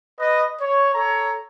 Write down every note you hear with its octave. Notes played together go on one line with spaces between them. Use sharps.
B4 D#5
C#5
A4 C#5 A#5